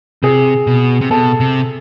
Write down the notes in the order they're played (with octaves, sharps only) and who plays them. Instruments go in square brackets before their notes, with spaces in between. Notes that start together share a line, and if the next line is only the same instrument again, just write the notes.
[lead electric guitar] C3 [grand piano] G#4
[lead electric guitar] B2
C3
[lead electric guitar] B2 [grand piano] A4
[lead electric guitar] C3